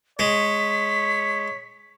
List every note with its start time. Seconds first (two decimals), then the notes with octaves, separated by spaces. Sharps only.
0.19 G#3 C#5 B6